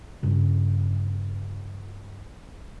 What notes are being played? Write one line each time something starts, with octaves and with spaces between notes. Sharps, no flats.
G2 C#3